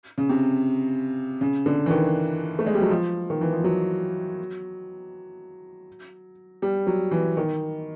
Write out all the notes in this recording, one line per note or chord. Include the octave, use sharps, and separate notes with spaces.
C#3
C3
C#3
D3
E3
D#3
A3
G#3
G3
F#3
F3
D#3
E3
F3
F#3
G3
F#3
E3
D#3